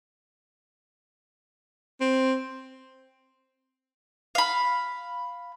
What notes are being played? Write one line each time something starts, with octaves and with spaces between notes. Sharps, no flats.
C4
F5 B5